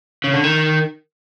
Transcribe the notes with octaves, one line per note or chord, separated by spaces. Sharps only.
C#3
D3
D#3